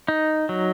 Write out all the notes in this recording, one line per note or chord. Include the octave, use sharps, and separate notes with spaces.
D#4
F#3